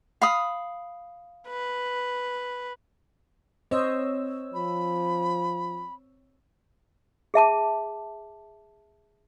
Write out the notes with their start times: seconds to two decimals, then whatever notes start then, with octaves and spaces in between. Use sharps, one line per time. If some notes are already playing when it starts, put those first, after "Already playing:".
0.22 F5 B5 D#6
1.48 B4
3.71 C4 C5 C#5 D#5 E6
4.54 F3 B5
7.34 G#4 E5 A5 D6